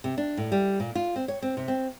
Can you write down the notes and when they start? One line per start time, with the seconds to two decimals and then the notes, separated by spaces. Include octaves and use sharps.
0.04 C3
0.18 D4
0.37 A2
0.52 G3
0.80 A#2
0.95 F4
1.16 C4
1.28 C#5
1.42 C4
1.57 C3
1.68 C4